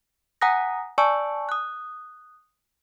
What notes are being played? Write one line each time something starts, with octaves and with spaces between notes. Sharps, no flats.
F#5 G#5 A#5 D#6 F#6 A#6
D5 G#5 A5 C#6 E6
D#6 F#6